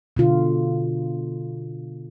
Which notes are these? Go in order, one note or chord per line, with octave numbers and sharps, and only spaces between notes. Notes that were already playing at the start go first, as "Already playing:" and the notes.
B2 D3 F4